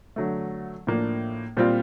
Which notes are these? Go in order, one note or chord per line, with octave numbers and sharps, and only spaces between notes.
D3 F#3 A3
A2 F3 A#3 D4
A#2 G3 C4 F4